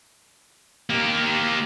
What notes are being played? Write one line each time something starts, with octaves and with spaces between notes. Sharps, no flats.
A#3 G4